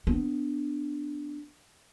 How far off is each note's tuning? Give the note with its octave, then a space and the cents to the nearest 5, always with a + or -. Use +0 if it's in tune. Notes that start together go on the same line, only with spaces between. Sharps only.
B3 +20 D4 +0